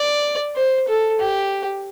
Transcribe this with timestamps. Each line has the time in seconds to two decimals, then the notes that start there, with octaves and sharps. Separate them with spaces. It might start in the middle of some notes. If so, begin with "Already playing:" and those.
Already playing: D5
0.56 C5
0.88 A4
1.20 G4